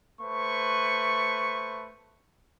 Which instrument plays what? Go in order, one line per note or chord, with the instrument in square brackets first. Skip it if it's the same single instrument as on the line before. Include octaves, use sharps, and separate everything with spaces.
[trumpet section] A3 B4 C5 C#6